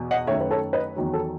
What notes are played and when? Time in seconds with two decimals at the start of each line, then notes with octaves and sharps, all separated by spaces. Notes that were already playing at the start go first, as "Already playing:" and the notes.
Already playing: E2 B2
0.11 D#5 F#5
0.27 F#2 D#3 A3 C#5 E5
0.41 B4
0.51 A4 C#5
0.73 B4 D#5
0.96 E2 D#3 F#3
1.14 A4